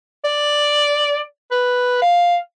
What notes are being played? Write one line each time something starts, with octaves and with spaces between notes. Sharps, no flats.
D5
B4
F5